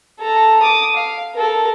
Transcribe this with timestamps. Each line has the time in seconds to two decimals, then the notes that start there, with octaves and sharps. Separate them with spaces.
0.19 A4 A#5
0.62 D6 D#6
0.96 F5
1.34 A4 A#4